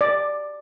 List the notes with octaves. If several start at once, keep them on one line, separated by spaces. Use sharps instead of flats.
D5